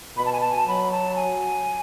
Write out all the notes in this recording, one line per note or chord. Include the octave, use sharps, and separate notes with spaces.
B2 B5
A5
G#5
A5
G#5
A5
F#3 B5
A5
G#5